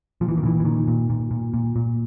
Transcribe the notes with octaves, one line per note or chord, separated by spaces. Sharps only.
A#2 F3
E3
D#3
A#2 E3
E3
A#2 D#3
A#2
A#2
A#2
A#2
A#2